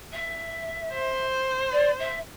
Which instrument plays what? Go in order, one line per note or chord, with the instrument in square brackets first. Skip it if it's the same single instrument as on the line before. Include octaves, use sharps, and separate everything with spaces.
[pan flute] E5
[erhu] C5
[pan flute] D5
E5